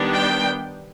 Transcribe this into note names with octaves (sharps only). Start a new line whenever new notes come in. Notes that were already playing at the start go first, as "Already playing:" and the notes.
Already playing: D#3 G3 B3 D4
G5